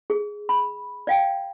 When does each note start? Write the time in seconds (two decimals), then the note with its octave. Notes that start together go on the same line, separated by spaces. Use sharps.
0.10 G#4
0.49 B5
1.07 D5 F5 G5